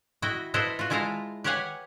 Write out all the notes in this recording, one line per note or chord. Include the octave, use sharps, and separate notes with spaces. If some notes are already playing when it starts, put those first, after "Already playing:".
E4 F#4 D#5 G5
E4 A4 B4 C5 D#5 F5
F4 F#4
G#3 E4 F4 F5 A5 A#5
G4 B4 C#5 F5 F#5 G#5